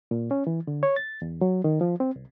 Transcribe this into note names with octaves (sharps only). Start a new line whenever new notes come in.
A#2
C#4
E3
D3
C#5
A6
E2
F#3
D#3
F3
C4
C2